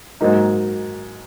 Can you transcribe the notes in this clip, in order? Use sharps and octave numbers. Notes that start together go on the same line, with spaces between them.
G#2 F#3 A#3 D#4